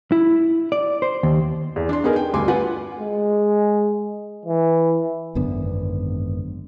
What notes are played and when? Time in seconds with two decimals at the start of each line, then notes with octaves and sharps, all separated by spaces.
0.12 E4
0.72 D5
1.02 C5
1.23 D#2
1.76 E2
1.89 D4 C6
2.04 B3 D#4 G#4 A#4
2.16 G5
2.33 D2 G2 G#5 C6 D6
2.48 F4 B4 F#5 G#5
2.99 G#3
4.45 E3
5.35 G#1 F#2 D3 B3